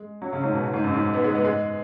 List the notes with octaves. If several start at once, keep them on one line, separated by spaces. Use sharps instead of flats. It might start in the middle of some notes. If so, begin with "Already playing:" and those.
Already playing: G#3
F#3
C#3
G#2
B2
G#2
F#2
G#2
B3
G#3
B3
G#3